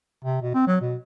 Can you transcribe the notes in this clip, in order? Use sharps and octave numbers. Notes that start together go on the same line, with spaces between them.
C3
B2
C4
F#3
B2